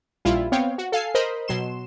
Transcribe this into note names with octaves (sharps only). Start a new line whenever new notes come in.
A#1 G3 E4 F4
B3 C4 C#5 F5 G5
F#4
A4 F5 G#5 C7
A#4 C5 D#5 B5
B2 F#3 C6 E7